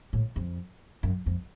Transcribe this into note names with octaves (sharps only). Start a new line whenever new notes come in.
A2
F2
F#2
F2